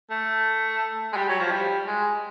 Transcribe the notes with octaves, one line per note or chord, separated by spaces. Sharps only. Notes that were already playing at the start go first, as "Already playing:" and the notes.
A3
G#3
G3
F#3
F3
G3
G#3